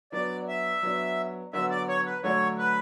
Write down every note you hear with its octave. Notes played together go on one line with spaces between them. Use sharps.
F#3 B3 D4 D5
E5
F#3 B3 D4
D3 F#3 B3 E5
D5
C#5
B4
D3 F#3 A3 D4 C#5
B4